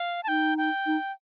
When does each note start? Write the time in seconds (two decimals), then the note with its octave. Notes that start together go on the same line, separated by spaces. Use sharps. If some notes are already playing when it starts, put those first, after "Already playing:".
Already playing: F5
0.23 A5
0.28 D#4 G5
0.58 G5
0.86 D#4